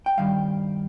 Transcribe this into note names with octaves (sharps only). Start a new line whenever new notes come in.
G5
G2 D#3 G3 F5